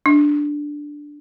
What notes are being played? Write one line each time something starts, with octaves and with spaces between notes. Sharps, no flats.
D4